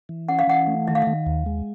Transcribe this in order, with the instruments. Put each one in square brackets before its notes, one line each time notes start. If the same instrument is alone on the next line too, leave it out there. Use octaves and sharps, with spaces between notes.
[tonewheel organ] E3
[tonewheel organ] C#4 [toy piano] F#5
[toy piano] F5
[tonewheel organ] E3 [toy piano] F#5
[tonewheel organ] A3
[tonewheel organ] D#3 [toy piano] E5
[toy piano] F5
E5
[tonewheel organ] D#3
D#2
G#3